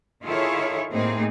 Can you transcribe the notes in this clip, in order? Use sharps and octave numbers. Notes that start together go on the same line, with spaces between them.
D#3 E4 F4 G#4 A4 C#5
A2 A#3 C4 D#4 G#4